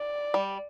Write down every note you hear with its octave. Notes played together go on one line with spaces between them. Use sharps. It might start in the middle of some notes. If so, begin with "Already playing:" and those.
Already playing: D5
G3